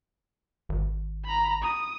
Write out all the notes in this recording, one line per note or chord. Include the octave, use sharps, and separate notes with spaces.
G#1
A#5 B5
D#6